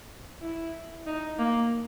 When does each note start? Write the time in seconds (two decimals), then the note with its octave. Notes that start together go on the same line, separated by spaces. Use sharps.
0.41 E4
1.07 D#4
1.39 A#3